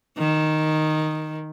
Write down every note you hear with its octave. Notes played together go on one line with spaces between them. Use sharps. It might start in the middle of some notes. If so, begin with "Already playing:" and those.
D#3